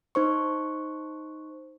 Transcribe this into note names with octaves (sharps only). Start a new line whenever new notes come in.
D#4 C5 C#6